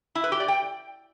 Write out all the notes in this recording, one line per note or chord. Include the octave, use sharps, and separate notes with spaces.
E4
B4
G4
D5
G5